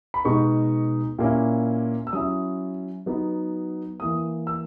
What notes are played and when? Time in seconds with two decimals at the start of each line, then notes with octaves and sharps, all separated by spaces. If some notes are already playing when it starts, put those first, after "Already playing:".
0.14 B5
0.25 B2 G#3 B3 D#4 C#6
1.19 A#2 A#3 C#4 E4
2.07 E6
2.13 F#3 C#4 E4 D#6
3.06 F#3 B3 D#4
4.00 E3 A#3 E4 D#6
4.47 E6